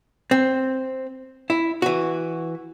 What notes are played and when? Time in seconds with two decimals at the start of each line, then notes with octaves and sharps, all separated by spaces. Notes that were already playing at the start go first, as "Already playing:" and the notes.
0.31 C4
1.50 E4
1.82 E3 F#4